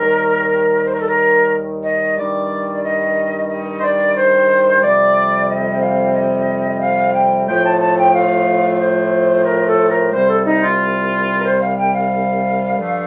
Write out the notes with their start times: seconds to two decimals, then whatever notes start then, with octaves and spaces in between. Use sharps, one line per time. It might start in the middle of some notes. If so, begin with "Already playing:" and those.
Already playing: D#2 D#3 G3 A#4
0.85 C5
0.92 A#4
1.00 A4
1.08 A#4
1.83 D#5
2.17 G2 D#3 G3 D5
2.72 D5
2.83 D#5
3.49 D#5
3.77 C5
3.83 D5
4.16 C5
4.82 F2 C3 G3 D5
5.48 D#5
5.81 F5
6.14 D#5
6.80 F5
7.13 G5
7.47 A2 F3 A3 G5
7.63 A5
7.80 A5
7.96 G5
8.13 F5
8.80 C5
9.45 A#4
9.67 A4
9.90 A#4
10.12 C2 C3 G3 C5
10.28 A4
10.45 D#4
10.61 F4
11.38 A#4
11.44 C5
11.61 F5
11.77 G5
11.94 F5
12.76 G2 D3 F3 A3